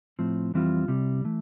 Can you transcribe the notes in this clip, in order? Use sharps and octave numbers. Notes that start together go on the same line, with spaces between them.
A2 F3 C4
F2 E3 G3 C4 F4
C2 C3 G3
E3 A3